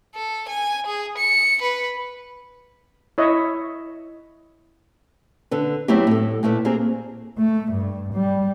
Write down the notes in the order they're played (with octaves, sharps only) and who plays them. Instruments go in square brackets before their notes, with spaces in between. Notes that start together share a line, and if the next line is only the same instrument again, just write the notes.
[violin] A4
G#5
G#4
C#7
B4
[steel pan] E4 C#5 D#5 E5
[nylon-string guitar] D3 A4 B4
F#3 A3 B3 C4 E4 G4
A2 A4
A#2 A3 E4 B4
A#3 C4 G4 G#4
[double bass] A3
G2
G3